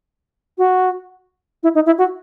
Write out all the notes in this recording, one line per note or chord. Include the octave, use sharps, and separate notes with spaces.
F#4
E4
D#4
E4
F#4